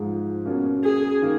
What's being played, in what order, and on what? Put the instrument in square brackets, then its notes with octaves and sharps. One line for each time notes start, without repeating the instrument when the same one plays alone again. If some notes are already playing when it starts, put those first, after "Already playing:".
Already playing: [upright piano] G#2 F3 G#3
B2 A#3 C#4
[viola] G#4
[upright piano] D#3 A#3